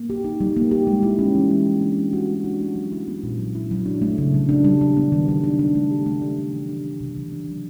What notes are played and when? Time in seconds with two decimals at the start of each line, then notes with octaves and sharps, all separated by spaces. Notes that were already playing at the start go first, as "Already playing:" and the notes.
Already playing: A#3
0.10 G4
0.24 D#4
0.41 G3
0.56 A#3
0.71 G4
0.87 G#3
1.03 E4
1.19 C#4
1.35 E3
1.51 G#3
1.67 E4
1.81 D4
1.98 A3
2.13 F#4
2.29 A3
2.44 D4
2.60 A3
2.76 F#3
2.92 E4
3.07 B3
3.23 A#2
3.39 F#3
3.55 E4
3.71 F#3
3.86 D4
4.02 A3
4.18 C#3
4.34 F#3
4.49 D4
4.64 G3
4.81 D4
4.97 B3
5.12 D#3
5.28 G3
5.44 D4
5.59 D4
5.75 A3
5.91 G4
6.06 A3
6.22 D4
6.38 A3
6.54 E3
6.69 D4
6.85 A3
7.01 C3
7.17 E3
7.33 D4
7.48 F#3